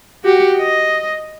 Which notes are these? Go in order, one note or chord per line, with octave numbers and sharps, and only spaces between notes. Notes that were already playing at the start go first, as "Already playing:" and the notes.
F#4 G4
D#5